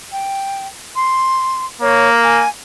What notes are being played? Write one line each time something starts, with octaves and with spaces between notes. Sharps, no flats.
G5
C6
A#3 C#5
G#5